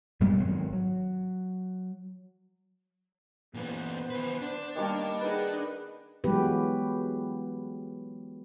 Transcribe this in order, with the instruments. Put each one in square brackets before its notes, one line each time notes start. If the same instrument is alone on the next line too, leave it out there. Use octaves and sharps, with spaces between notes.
[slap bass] F#2 B2 G3 G#3
G#1 F#3
F#3
[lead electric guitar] A#2 E3 [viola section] B3 C5
[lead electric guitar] D#3 B4
D4
[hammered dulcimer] D#3 G3 A5 [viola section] A#3 C#5
[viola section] D#4 G#4 F#5 [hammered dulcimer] B4
[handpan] E3 F#3 G#3 B3 G4 B4